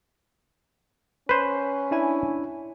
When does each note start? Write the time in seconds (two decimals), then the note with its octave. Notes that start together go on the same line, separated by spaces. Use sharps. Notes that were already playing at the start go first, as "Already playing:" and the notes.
1.29 C#4 B4 C5
1.91 D4 E4 G#5